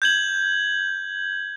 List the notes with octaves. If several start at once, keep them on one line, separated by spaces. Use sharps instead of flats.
G6 G#6 F#7